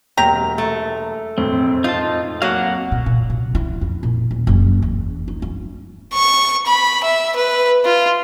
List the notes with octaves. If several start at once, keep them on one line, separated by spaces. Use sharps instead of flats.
E1 F#3 A#3 G4 A#5
A3
E1 F2 A2 C4
D#4 F4 A5
F#3 A#3 F5 F#5
A#2
A#2
C3
E4
F2
A#2
D#2
F#1
E2
D#4
G3
C#6
B5
E5
B4
F4